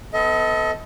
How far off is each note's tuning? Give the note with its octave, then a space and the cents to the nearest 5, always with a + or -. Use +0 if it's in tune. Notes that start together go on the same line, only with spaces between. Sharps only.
B3 +30 A4 +0 D#5 +35